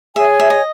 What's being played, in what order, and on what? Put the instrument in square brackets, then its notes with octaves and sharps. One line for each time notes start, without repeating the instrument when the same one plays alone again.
[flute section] G#4 C#5 G#5 [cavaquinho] E5
[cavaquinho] E5
D#5